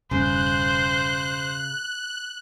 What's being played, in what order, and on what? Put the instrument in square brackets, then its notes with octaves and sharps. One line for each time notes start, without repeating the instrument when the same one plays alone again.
[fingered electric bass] E1 G2 [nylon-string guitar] C#3 [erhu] C5 [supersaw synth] F#6